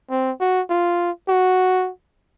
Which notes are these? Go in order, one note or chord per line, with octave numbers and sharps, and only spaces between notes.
C4
F#4
F4
F#4